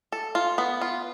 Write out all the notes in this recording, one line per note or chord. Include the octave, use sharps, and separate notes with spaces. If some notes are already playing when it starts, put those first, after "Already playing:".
A4
F4
B3
F4